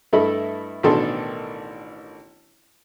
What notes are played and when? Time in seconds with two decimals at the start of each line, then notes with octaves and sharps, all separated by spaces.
0.13 G2 A3 E4 A4 D#5 B5
0.83 A1 B2 D#3 D4 A4 C6